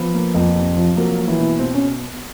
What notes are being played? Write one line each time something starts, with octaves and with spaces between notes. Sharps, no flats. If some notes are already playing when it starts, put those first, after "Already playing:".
Already playing: F3 B3 B4
A#3
F2
C3
F3
F#3 A#3 A#4
A#3
E3 E4
B2
B2 C4
C#4